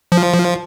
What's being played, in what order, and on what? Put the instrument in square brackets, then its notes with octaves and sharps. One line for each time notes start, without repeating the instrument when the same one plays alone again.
[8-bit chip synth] F3